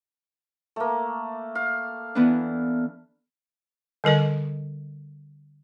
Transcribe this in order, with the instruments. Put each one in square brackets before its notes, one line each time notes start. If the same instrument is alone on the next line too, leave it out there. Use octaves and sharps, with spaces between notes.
[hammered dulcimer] A3 A#3
F5
[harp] E3 B3 D4
[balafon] D3 G3 A#4 D#5